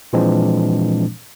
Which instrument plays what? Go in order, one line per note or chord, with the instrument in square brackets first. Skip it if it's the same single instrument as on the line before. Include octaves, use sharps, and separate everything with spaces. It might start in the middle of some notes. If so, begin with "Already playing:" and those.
[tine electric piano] A#2 E3 F3 G#3 C4 D4